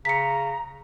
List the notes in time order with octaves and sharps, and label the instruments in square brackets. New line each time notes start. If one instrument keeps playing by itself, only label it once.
[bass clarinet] C#3 [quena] A#5 [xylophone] B6 C#7